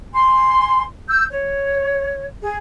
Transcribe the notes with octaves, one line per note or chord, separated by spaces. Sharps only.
G#5 C6
E6 G6
C#5
G#4